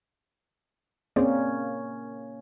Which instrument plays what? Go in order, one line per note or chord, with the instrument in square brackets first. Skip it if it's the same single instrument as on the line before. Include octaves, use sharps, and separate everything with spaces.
[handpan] A#3 C#4 [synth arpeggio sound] C4 G#4 D5